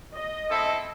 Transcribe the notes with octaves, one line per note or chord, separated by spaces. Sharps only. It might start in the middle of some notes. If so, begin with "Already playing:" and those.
D#5
C4 E4 A4